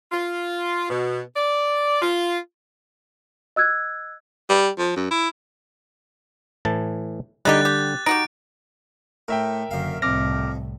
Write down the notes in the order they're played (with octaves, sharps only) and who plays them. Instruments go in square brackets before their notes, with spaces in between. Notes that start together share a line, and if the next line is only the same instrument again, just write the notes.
[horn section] F4
B2
D5
F4
[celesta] D#5 E6 F#6 G#6
[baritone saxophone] G3
F3
F#2
E4
[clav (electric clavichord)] A2 E3 A5
[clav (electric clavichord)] D3 G3 [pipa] G#3 D#4 G4 [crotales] F#6 A6
[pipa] G4
[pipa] D#4 F#4 G4 [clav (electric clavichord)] A#5 [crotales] D7
[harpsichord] A2 [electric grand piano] A#4 E5 G5
[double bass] F#1 D3 [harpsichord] F#2 F5
[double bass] C2 A2 [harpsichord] F2 [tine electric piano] D6 F6 A#6